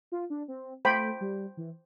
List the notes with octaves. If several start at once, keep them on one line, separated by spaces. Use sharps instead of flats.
F4
D4
C4
A3 C5 G5 B5
G3
E3